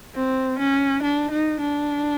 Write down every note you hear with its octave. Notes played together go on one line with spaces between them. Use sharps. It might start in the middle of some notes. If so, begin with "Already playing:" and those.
C4
C#4
D4
D#4
D4